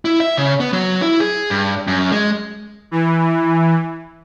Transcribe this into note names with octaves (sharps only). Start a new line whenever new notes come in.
E4
E5
C#3
B3
F#3
E4
G#4
G2
F#2
G#3
E3